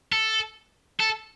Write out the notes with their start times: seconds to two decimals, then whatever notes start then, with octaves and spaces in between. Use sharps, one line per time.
0.12 A4
1.00 A4